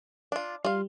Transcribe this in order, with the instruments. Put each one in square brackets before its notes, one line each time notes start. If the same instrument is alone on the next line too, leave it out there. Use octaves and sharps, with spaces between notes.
[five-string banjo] D4 F4
[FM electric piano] G3 [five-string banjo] F4 F5